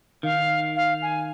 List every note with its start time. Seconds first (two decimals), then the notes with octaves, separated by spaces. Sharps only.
0.23 D#3 F5
0.76 F5
1.02 G#5